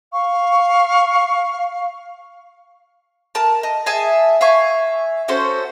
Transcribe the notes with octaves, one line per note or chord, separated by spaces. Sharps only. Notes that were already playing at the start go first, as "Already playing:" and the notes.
F5 C#6
A#4 A5
D#5
G#4 E5 G#5 A5
E5 F5 G#5 C#6
C#4 F#4 A4 C5